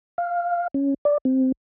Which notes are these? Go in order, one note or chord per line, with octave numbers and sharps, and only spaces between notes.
F5
C#4
D5
C4